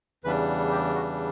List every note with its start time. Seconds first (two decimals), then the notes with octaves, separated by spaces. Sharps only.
0.24 E2 C#3 E3 G3 D4 B4
0.71 G4
0.95 F#4